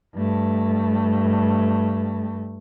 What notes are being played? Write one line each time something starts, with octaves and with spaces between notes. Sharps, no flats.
G2 A3